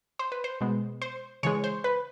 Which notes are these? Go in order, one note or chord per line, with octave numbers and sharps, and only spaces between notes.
C5
B4
C5
B2 G#3 B3
C5
C#3 E3 G#3 C#5
C5
B4